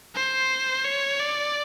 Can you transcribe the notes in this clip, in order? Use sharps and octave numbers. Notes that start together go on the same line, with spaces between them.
C5
C#5
D5